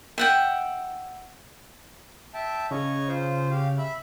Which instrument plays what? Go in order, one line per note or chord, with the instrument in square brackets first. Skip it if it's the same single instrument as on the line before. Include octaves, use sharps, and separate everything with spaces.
[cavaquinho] E5 F#5 G5
[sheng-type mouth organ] E5 G5 A5
[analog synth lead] C#3 [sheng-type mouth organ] C#5 D#5
[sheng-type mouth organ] F4 C5
G4 F5
E5 B5